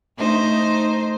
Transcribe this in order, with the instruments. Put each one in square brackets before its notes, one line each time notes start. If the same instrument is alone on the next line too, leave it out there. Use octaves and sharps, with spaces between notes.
[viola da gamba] A3 D#4 C5